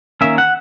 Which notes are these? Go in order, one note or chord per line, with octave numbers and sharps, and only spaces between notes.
D#3 A#3 C#4 E5
F#5